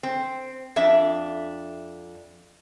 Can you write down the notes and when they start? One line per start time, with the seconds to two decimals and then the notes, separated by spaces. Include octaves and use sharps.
0.03 C4
0.76 F2 D4 E5